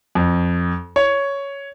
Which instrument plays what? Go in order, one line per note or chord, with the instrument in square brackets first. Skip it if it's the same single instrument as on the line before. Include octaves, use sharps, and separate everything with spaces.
[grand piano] F2
C#5